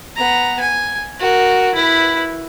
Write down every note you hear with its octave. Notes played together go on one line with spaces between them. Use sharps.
B3 A#5
G#5
F#4 A#4
E4 B4